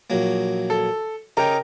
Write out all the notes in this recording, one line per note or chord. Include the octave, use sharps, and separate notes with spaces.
A#1 F#3 A#3
A4
C#3 D#4 G4 A#4 G5